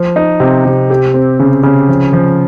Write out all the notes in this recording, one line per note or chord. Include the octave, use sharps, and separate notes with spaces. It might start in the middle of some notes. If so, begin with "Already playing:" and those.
Already playing: F3
D#4
C3
C3
G4
C4
C#3
C#3
F3
F3